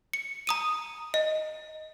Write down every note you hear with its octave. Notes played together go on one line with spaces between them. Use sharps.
C#7
A#5 D#6 D#7
D#5